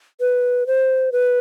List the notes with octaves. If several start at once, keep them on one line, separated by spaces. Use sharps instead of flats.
B4
C5
B4